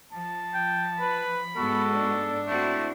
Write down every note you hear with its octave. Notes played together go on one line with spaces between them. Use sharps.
F3 A5
G5
B4 B5
G#2 G#3 B3 F#4 A4
D4
A3 C4 E4 F#4